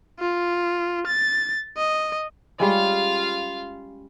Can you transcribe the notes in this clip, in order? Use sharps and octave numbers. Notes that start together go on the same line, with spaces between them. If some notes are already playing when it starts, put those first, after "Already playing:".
F4
A6
D#5
G3 G#3 C#4 F4 F5